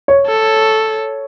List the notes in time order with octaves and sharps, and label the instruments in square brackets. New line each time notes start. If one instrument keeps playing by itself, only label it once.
[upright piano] C#5
[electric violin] A4